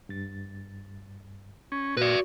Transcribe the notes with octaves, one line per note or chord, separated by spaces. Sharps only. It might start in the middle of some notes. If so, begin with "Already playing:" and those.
G2 A6
C#4
A#2 F#4 B4 D5